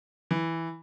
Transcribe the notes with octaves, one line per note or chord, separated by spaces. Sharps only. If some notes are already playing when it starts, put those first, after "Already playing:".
E3